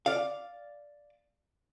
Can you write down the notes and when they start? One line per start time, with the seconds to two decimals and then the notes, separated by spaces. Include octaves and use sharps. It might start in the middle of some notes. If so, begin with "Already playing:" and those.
0.06 D5 F5